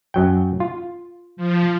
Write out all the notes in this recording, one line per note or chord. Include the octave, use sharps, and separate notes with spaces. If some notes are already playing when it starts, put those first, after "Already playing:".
F#2 F#3 G5
F4
F3